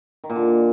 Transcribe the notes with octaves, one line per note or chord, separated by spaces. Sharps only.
D#3
A#2
D3